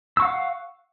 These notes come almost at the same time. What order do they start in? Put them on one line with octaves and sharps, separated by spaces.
E6 C#6 F#5 F5